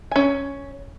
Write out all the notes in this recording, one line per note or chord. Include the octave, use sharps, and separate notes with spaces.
C#4 G#5